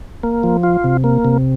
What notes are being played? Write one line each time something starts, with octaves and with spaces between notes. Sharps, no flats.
A#3
F3
F4
C3
A#3
C3